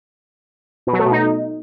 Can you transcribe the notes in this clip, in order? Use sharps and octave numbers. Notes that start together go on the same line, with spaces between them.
B2
F#3
A3
B2
D#4